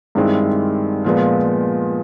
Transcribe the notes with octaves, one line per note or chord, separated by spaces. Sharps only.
G2 D#3 G#3 C4 E4
A#2 F3 G#3 B3